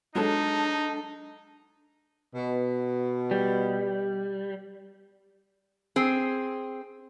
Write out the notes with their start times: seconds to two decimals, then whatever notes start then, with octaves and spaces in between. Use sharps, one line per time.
0.15 F#3 G#3 D4 D#4 A4
2.35 B2
3.31 G3
5.96 C4 G#4